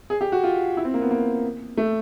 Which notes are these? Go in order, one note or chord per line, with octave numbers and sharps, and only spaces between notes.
G#4
G4
F#4
F4
E4
C4
A#3
B3
A#3
A3